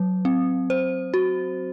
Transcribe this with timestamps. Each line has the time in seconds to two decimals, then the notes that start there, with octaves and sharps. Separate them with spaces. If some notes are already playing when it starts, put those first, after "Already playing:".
Already playing: F#3
0.25 C4
0.70 C5
1.14 F#4